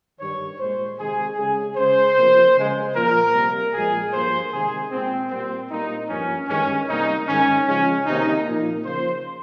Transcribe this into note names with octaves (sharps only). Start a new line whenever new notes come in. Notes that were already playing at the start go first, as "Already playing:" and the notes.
G2 D#3 G3 C#5
A#2 G#3 C5
C3 D#3 G#3 G#4
C#3 G#3 G#4
C#3 G#3 C5
C3 F3 A#3
C#3 G#3
A#2 F3 A#3 A#4
C3 G3 A#3
A#2 F3 G#3 G#4
G2 F3 A#3 C5
C3 D#3 G#3 G#4
A#2 G#3 C4
A#2 G3 A#3 C4
A#2 G3 A#3 D#4
G2 F3 A#3 C#4
G2 D#3 G#3 C#4
C3 G3 A#3 D#4
G#2 D#3 G#3 C#4
C#3 F3 G#3 C#4
C3 D#3 A#3 D#4
A#2 F3 A#3
C#3 F3 A#3 C5